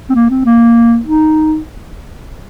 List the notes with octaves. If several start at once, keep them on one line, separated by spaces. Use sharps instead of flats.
C4
A#3
C4
A#3
D#4